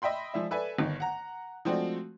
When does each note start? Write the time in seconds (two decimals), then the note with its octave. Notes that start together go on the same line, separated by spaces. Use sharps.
0.02 D#5 E5 G5 B5 C6
0.34 F3 G#3 D5 E5
0.51 A4 B4 D5 E5 G#5
0.79 G1 D#3
1.00 F#5 A#5
1.65 F3 G#3 A3 C4 D4 F#4